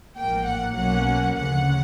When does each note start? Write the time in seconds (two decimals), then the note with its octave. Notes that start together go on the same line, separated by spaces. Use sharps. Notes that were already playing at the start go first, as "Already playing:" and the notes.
0.17 A1 G#2 F3 A#3 G5
0.47 F#5
0.76 B1 B2 F#3 A#3 C#4 F#5
1.36 D2 C#3 F3 F#5